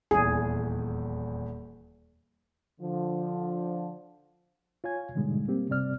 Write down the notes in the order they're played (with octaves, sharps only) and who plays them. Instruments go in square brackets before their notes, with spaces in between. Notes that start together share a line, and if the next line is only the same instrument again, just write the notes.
[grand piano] D#1 E2 [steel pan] G#4
[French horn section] D3 F3
[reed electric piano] F4 C#5 F5 G#5 G#6
G#2 B2 D3 G3 G#3 D#4
G3 A#3 C4 G4
G2 C3 G3 C4 D5 F6